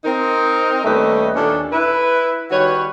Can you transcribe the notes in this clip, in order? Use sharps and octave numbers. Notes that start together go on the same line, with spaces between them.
C4 D#4 A#4
D#2 G3 A3 C#4 B4 D#5
D#2 A#2 C#4 D4 A4
E4 B4 E5
D#3 G3 F#4 B4 C#5